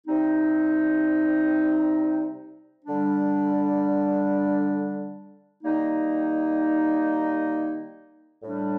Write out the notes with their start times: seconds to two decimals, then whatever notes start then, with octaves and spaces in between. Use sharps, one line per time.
0.07 C3 G3 C4 D#4
2.85 D3 G3 D4
5.63 D#3 G3 A#3 D#4
8.43 A2 G3 D4